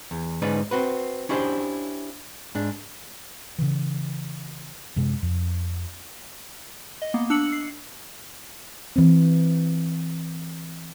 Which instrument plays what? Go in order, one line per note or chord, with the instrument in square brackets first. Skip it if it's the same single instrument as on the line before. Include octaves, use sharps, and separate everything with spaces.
[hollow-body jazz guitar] E2
G#2 D3 C#4 D#4 B4 D5
C4 F#4 B4
C#4 D4 E4 G4 B4 C5
G#2 D4
[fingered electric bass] C#3 E3
F#2 C3 G#3
F2
[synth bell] D#5
A#3 B3
D4 E6 C#7 F#7
C7
[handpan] E3 C4